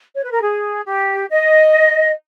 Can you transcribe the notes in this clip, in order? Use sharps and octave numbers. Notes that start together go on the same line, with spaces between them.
C#5
B4
A#4
G#4
G4
D#5